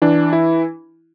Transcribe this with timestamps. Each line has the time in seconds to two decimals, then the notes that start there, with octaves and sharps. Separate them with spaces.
0.02 E3 D4
0.33 E4